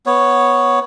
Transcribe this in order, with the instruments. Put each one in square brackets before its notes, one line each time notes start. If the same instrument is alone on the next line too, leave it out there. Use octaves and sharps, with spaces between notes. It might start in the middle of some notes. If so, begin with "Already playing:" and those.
[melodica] B3 C#5